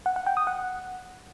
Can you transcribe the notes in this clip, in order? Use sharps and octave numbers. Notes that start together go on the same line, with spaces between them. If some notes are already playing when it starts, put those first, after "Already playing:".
F#5
F#5
G5
D#6
F#5